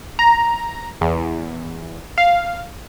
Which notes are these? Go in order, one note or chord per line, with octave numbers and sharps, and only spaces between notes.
A#5
E2
F5